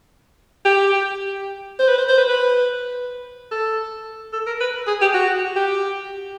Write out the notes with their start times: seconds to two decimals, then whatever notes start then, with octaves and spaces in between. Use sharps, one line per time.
0.65 G4
1.79 C5
1.88 B4
1.98 C5
2.09 C5
2.18 B4
2.29 B4
3.51 A4
4.33 A4
4.47 A#4
4.60 B4
4.87 G#4
5.01 G4
5.14 F#4
5.56 G4